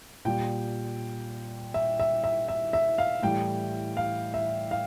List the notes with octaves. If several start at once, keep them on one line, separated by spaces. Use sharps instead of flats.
A#2 G3 G5
E5
E5
E5
E5
E5
F5
A2 E3 G3 G5
F5
E5
F5